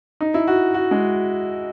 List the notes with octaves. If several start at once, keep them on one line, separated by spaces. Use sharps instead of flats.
D#4
E4
F#4
F#4
G#3